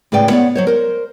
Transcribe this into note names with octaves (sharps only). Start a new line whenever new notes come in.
A2 C#3 G#4 B4 D5 G5
B3 C#5 D5 F#5
F#3 C5 C#5
A#4 C5